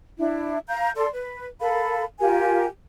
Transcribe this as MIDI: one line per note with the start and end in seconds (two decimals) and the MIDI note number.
0.18 0.58 62
0.18 0.58 64
0.68 0.90 77
0.68 0.90 82
0.68 0.90 91
0.96 1.07 69
0.96 1.07 74
0.96 1.07 84
1.13 1.46 71
1.61 2.02 69
1.61 2.02 70
1.61 2.02 77
1.61 2.02 83
2.19 2.65 65
2.19 2.65 67
2.19 2.65 70
2.19 2.65 80